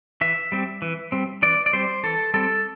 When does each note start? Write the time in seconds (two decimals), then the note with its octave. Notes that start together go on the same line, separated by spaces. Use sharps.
0.21 E3 E5
0.52 G3 C4
0.82 E3
1.12 G3 C4
1.43 E3 D5
1.66 D5
1.73 G3 C4 C5
2.03 E3 A4
2.34 G3 C4 A4